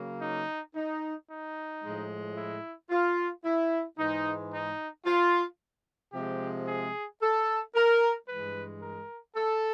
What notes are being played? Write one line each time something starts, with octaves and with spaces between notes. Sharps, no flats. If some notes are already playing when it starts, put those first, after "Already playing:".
Already playing: C#3 F#3 A#3
D#4
D#4
D#4
A2 F3 G#3
E4
F4
E4
G#2 E3 G#3 D#4
D#4
F4
C3 F3 G#3 G4
G#4
A4
A#4
G2 E3 G#3 B4
A#4
A4